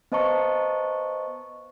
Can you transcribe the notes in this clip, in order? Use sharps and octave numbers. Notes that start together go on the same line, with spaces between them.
B3 C5 D#5 A5 A#5 C#6